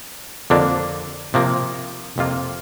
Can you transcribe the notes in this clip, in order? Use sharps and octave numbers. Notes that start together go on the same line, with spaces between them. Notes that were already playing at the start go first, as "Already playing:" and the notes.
F2 D3 A#3 D4
C3 F3 A#3
F2 C3 A#3 F4